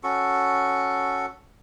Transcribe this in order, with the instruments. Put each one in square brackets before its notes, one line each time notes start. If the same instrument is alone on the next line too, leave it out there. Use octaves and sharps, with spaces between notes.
[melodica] C#4 F#4 A4 C#6